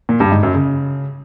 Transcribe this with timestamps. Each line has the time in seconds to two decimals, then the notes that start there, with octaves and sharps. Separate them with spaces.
0.09 A#2
0.20 G2
0.32 G#2
0.43 F#2
0.54 C#3